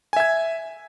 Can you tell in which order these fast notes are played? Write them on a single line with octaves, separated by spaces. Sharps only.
G#5 E5 G#6